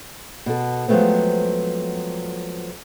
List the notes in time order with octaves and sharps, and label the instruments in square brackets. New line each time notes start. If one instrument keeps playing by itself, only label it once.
[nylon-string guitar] B2 A4
F3 F#3 G#3 A3 B3 C4